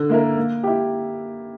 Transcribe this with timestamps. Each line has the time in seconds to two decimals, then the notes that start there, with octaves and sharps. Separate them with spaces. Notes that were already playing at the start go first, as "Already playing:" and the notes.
Already playing: D3
0.09 A#3 E4 A#4
0.37 A#3
0.63 E4 G4